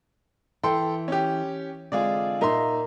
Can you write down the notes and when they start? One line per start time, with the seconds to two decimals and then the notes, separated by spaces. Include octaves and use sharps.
0.63 E3 A4 G5 C6
1.08 C#4 G4
1.92 D3 G#3 C4 F4 G#4 D5
2.41 A#2 D#4 A#4 E5 C6